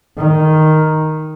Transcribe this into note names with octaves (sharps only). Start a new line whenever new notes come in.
D#3